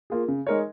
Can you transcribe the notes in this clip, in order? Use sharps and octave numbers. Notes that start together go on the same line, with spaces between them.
A#3 F4 G#4
C#3
G#3 D#4 A#4 C#5